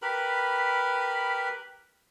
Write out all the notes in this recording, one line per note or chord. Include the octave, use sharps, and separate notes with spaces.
G4 A#4 B4 B5